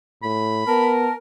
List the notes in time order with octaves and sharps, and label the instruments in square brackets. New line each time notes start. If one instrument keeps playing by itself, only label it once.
[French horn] A2 [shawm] B5
[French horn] B3 [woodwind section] A#4 [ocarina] A5